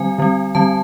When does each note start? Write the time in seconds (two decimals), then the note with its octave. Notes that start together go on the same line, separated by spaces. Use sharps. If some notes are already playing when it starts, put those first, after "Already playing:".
Already playing: D3 G3 C4 G#5
0.18 D3 G3 C4
0.55 D3 G3 C4 A5